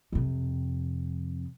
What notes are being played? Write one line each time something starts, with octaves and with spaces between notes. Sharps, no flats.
F2 C3